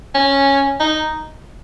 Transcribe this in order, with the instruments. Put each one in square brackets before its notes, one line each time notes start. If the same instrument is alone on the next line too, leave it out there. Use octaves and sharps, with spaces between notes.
[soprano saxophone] C#4
D#4